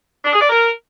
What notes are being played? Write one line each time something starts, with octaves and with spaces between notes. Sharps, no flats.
D4
G#4
D5
A#4